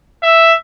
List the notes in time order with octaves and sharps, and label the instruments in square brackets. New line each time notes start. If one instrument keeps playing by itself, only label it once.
[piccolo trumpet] E5